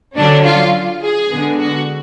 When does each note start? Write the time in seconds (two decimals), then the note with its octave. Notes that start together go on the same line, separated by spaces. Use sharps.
0.16 D3 F#3 C#4 D4
0.44 F4
1.02 G#4
1.30 D3 G#3 B3
1.59 F#4